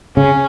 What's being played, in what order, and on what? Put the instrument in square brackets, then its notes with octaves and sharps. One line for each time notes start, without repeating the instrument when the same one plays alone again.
[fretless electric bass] C#3 [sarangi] C#4